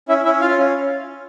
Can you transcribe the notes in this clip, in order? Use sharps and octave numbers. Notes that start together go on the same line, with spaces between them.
C#4 E4 E5
C#4 E4 E5
F4 F5
C#4